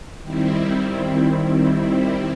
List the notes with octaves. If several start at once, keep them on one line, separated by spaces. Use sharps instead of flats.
D#3 G3 C4 E4